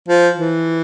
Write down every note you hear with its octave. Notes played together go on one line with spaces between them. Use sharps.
F3
E3